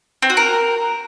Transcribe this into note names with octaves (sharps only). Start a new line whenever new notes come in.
C4
F#4
A#4